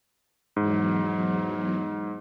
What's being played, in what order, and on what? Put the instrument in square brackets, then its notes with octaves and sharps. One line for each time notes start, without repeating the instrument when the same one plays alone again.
[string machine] E2 F#3 [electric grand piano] G#2